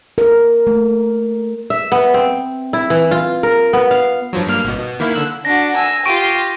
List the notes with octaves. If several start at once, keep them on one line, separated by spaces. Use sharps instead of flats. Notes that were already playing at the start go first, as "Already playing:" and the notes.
A#4
A3
E5
B3
C4
E4
E3
F4
A#4
B3
F5
G2 F3 F#3
G2 A#3 F6
G#1 B2
B2
D#3 A#3 E4
D3 E6 F#6
D4 F#4 A#6
G#5 E6
F4 G4 C#6 D7